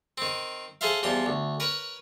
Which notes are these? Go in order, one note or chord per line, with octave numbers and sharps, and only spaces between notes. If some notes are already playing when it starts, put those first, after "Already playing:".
D#3 C4
G#4 A4 C5 E5 F5
E2 F3 G3 C6
D2
A#4 B4 C#5